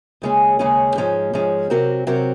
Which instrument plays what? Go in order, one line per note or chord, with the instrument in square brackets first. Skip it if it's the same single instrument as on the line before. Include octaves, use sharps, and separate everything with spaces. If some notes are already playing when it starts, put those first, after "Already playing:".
[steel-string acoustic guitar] D#2 C#3 G#3 C#4 G#4
D#2 C#3 G#3 C#4 G#4
G#2 F3 G#3 C#4
G#2 F3 G#3 C#4
C3 F#3 C4 F#4 A#4
C3 F#3 C4 F#4 A#4